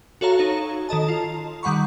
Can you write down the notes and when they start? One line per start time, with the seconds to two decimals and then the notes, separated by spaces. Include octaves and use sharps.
0.21 F#4 A4 C#5 F5 A#5
0.39 D#4 A4 C#5
0.89 D#3 A4 D#5 A5
1.08 F4
1.63 D#3 G3 F#5 B5 C#6